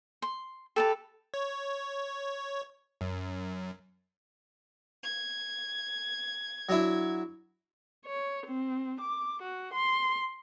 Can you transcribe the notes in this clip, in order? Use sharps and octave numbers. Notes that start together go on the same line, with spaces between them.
C6
G4 A4 B4 A5
C#5
F#2
G#6
F#3 D4 E4
C#5
C4
D6
F#4
C6